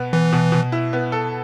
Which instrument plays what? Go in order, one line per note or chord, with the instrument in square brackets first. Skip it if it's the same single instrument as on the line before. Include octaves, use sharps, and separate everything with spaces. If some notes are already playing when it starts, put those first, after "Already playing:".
Already playing: [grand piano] B2 B3
[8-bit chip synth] E3 [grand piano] B3
[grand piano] B2
B2
E4
B3
A4